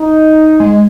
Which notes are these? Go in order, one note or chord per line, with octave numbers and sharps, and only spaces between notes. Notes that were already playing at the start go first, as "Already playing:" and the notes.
Already playing: D#4
G#3